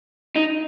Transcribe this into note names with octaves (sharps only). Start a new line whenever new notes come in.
D#4